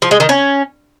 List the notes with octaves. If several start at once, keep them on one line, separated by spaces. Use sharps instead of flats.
F3
G#3
D#3
C#4